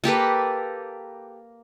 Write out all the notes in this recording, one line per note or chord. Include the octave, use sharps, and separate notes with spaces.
A#3 G4 A4 B4